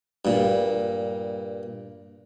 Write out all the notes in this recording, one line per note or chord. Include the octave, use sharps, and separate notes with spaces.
G2 A#2